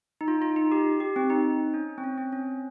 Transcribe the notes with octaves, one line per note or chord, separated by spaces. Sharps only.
D#4
F4
F4
D#4
G4
G4
C4
D#4
C#4
C4
C#4
C4
C#4